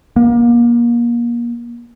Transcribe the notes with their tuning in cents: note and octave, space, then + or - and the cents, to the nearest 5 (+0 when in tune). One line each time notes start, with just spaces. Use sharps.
A#3 +30